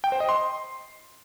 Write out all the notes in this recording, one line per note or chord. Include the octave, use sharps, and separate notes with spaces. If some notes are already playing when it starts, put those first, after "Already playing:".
G5
C5
D#5
C6